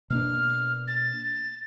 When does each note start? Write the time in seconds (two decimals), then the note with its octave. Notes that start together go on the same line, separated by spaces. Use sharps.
0.10 B2 A#3 D4 F6
0.88 A6